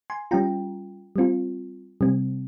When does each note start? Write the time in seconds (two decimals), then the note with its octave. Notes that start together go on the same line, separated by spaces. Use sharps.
0.10 G#5 C6
0.31 G3 C#4 F4 G5 A#5
1.16 G3 C4 F4
2.01 C3 G3 C4